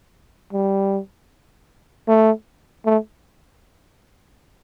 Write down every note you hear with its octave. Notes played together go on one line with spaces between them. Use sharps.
G3
A3
A3